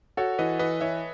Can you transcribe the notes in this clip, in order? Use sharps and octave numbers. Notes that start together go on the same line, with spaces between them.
F#4 A4 C#5
E3 B4 D#5
E3 B4 D#5
E3 C#5 E5